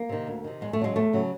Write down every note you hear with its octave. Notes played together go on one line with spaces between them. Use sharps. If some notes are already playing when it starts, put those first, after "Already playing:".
Already playing: A#3
C3 D#3
D2
C3 D#3
E2 G#3
A3
C#3 F#3 G#3
E2 A3
C#3 F#3